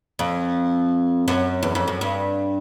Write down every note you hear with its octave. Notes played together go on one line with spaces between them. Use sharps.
F2
F#2
E2
F2
F#2
G2